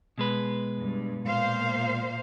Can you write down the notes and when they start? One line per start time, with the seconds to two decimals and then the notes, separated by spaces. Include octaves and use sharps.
0.18 B2 G#3 B4
0.80 G2
1.25 A#2 C5 F5